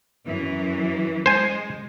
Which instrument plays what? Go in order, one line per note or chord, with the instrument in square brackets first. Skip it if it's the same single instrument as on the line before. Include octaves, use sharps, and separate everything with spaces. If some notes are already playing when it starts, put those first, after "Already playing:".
[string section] F#2 E3
[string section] G#3 [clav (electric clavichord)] C5 G#5